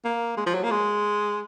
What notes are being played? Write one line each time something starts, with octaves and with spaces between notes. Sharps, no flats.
A#3
G#3
F3
F#3
A#3
G#3